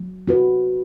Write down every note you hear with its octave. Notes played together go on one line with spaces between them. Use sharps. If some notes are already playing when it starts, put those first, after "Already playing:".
Already playing: F#3
C4 F#4 B4